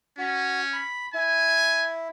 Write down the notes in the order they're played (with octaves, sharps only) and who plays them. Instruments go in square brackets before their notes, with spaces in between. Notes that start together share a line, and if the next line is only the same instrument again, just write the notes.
[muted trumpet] C#4 [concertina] F#4
[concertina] B5
[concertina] E4 [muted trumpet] G#5